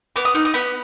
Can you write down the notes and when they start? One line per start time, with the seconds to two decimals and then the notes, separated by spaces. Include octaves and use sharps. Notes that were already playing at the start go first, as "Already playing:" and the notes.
0.16 B3 D6
0.25 D#6
0.35 D#4 F6
0.45 D#6
0.54 B3 B5